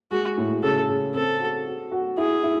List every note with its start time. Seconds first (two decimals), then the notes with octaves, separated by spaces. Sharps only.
0.11 G#3 F#4
0.37 A2
0.63 C#3 A4
0.89 C#3
1.14 C4 A4
1.39 F#4
1.66 F#4
1.92 F#4
2.17 E4 G#4
2.43 E4